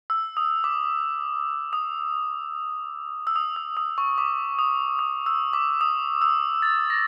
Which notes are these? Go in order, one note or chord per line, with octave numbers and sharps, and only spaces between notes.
E6
D#6
D6
D#6
E6
D#6
E6
D#6
C#6
D6
D#6
D#6
E6
D6
D#6
E6
A6
A#6